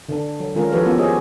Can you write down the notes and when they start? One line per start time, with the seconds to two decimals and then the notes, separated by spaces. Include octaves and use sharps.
0.09 D3 D4
0.40 F#3
0.55 D#3 F#3 G#3 C#4 F4 A#4
0.72 E3 F3 G4 A4 B4 C#5
0.86 A#3 B3 C#4 F4
0.98 G4 G#4 C5 C#5 D#5